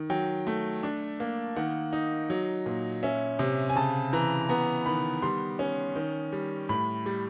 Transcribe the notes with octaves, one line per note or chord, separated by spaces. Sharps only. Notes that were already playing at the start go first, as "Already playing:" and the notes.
Already playing: D#3
F#3 G5
A3
D4
A#3
D#3 F#5
D#4
F#3
A#2
C#4 E5
C3
G#5
C#3 A5
E3 A#5
B3 A#5
D#3 B5
G3 C6
C#4
D#3
G3
A2 B5
G3